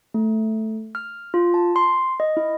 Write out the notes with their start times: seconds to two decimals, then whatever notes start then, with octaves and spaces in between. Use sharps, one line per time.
0.14 A3
0.95 F6
1.34 F4
1.54 A5
1.76 C6
2.20 D#5
2.37 E4